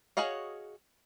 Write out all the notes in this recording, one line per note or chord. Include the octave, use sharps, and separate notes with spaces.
F#4 G#4 C#5 D#5 F5